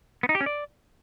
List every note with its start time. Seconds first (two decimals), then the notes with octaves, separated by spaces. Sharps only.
0.23 B3
0.29 D#4
0.35 G4
0.41 C#4
0.46 D5